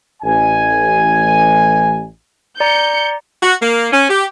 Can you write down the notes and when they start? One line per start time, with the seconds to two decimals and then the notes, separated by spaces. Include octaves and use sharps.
0.23 A1 G#5
2.60 D5 A#5 G6 C#7
3.42 F#4
3.62 A#3
3.92 C#4
4.10 G4